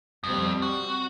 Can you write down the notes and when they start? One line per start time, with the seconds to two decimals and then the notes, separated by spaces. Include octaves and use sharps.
0.24 F2 G3 C4
0.62 F#4